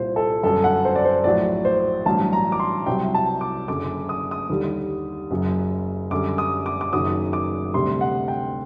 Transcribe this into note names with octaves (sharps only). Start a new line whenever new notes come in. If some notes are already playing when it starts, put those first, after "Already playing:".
Already playing: C2 A#2 G3 C5
A4
G1 F#2 F#3 A4
F#5
C5
D5
C5
A#1 A2 F#3 D5
C5
A1 G2 F#3 A5
A#5
D6
C6
C2 C3 F#3 G5
A5
D6
F#1 F#2 D3 D6
D#6
D#6
D#2 D3 G3
F#1 F#2 F#3
F#2 D3 G3 D6
D#6
D6
D6
F#1 F#2 D#3 F#3 D#6
D6
D2 C3 G3 C6
F#5
G5